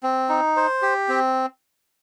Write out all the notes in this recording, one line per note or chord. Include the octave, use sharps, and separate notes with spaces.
C4
D#4
C5
G4
C4